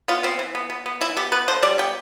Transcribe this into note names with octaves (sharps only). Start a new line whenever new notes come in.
B3 F4
B3 C4
E3
B3
B3
B3
E3 E4
B3 G4
B3 B4
D3 C5
G3 D5
B3 G5